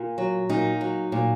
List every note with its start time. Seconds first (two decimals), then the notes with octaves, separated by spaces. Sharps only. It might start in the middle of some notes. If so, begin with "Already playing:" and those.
Already playing: A#2
0.18 F#3
0.49 A#2 D#4
0.81 F#3
1.12 A#2